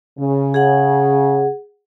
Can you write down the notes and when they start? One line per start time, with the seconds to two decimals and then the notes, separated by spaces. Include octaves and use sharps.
0.19 C#3
0.54 G#4 F#5